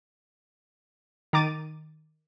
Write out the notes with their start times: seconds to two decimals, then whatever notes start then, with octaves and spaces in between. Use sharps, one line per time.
1.33 D#3 A#5 D6 A6 D#7